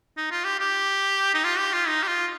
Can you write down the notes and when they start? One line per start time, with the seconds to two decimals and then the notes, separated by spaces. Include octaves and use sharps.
0.17 D#4
0.31 F4
0.44 G4
0.59 G4
1.34 D#4
1.44 F4
1.58 G4
1.73 F4
1.87 D#4
2.03 G4
2.07 F4